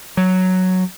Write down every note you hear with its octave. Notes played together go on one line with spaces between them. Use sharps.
F#3